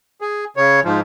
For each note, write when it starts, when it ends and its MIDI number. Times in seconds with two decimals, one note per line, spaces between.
0.21 0.45 68
0.57 0.80 49
0.57 0.80 73
0.84 1.01 44
0.84 1.01 53